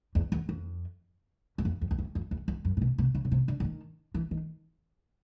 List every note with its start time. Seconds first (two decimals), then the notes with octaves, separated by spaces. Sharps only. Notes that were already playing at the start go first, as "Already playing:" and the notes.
0.15 E2
0.32 E2
0.49 F2
1.58 F#2
1.65 F2
1.81 F2
1.91 E2
1.98 F2
2.15 F2
2.31 E2
2.48 F2
2.65 F#2
2.77 A#2
2.81 B2
2.98 C3
3.15 C#3
3.25 C#3
3.31 C3
3.48 D3
3.60 D3
3.64 D#3
4.14 E3
4.31 D#3